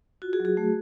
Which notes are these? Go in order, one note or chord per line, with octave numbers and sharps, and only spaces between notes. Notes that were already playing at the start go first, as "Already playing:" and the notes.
F4 F#4
F#4 G#4
F#3
F#4 G#4
A3